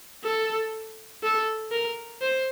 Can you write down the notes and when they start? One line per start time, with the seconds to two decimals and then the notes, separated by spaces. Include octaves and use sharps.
0.23 A4
1.23 A4
1.72 A#4
2.22 C5